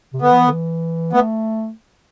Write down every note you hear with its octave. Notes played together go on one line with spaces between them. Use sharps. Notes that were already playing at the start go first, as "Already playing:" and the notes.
C3
D3 B3
F3
E3
D3
E3
A3 B3